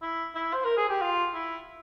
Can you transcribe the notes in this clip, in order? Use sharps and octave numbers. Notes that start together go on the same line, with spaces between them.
E4
E4
C5
A#4
G#4
G4
F4
E4